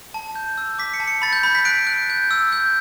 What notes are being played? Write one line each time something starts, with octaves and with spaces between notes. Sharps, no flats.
A5
G6
E6
D6 B6
C#7
A5
C#7
B5 A6
G6
B5
B6
F#6 D7
F#6
G6
E6
G6